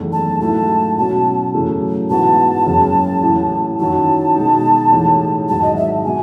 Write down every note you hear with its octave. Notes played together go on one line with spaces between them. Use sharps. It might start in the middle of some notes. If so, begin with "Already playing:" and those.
Already playing: F#1 E2 D#3 A3
A5
G#2 F#3 A3 E4 A5
B2 F#3 C#4 F#4 A5
F#2 C#3 E3 A3
G#2 E3 B3 F#4 A5
F#1 F#2 C#3
A1 A2 E3
F#2 D#3 F#3 A5
B2 G#3 D#4
A1 A2 G#3 D#4
G#1 G#2 F#3 A5
D#5
E5
B2 G#3 G#5